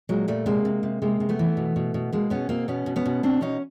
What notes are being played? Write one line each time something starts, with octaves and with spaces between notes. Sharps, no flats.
A#2 F#3 G#3
A#2 G3 A3
C3 G#3 A#3
C3
C3
C3 G#3 A#3
C3
A3 B3
E3
B2
B2
B2
B2 G#3 A#3
B2 B3 C#4
B2 A#3 C4
B2 B3 C#4
B2
B3 C#4
B2
B2 C4 D4
B2 C#4 D#4